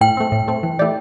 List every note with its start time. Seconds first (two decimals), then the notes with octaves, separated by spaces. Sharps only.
0.01 A2 G5
0.17 A3 C4
0.32 A2
0.48 A3 C4
0.63 E3
0.79 A3 E4 G4 D5